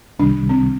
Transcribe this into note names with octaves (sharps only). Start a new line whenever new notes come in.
C2 C3 D#3 G3 D4
C4